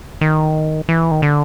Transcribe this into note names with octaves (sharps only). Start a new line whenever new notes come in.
D#3
E3
D#3
D3